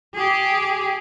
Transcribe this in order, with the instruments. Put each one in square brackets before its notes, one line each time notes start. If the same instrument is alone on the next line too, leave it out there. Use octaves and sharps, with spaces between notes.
[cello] G4 G#4